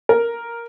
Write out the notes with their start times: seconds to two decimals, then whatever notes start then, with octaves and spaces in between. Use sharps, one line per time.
0.09 A#4